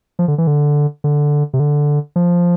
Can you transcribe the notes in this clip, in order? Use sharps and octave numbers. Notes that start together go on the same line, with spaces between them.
F3
D3
E3
D3
D3
C3
D3
F3